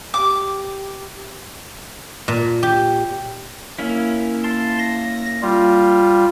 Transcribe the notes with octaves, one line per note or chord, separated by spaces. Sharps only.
G4 D6
A#2
G4
A#3 C#4 E4
A5 C6
A#6
G3 F4